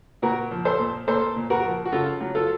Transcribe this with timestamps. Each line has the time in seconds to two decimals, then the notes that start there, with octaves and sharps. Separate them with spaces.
0.22 A#2 F#4 A#4
0.51 F3
0.65 A4 C5
0.79 A#2
1.07 A#3 A4 C5
1.36 A#2
1.50 F#4 A#4
1.64 F3
1.85 F#4
1.92 C#3 F4 A4
2.21 F#3
2.35 F4 A4